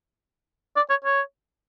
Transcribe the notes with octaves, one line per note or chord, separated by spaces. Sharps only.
D5
C#5
C#5